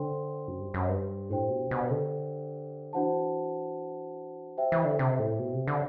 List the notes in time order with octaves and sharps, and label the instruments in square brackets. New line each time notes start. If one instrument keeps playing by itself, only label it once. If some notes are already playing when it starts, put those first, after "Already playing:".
Already playing: [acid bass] D3 [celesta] C5 G5 C6
[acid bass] F#2
G2
F#2
G2
[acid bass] A2 [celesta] D4 G4 C5 G5
[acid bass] B2
B2
D3
[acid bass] E3 [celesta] D4 F#4 C5 F#5 A5
[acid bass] F#3 [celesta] G4 C5 E5 G5
[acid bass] E3
D3
C3
A2
B2
C3
D3